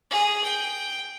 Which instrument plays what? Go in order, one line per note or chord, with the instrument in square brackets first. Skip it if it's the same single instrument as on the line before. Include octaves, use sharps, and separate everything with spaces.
[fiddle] G#4
G5